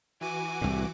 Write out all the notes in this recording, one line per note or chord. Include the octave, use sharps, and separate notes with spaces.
E3 F#4 G#5 D6
C2 A2